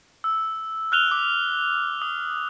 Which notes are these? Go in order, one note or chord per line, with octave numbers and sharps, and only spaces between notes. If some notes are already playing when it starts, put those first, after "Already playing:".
E6
F6 F#6 F7 G7
D6
D#6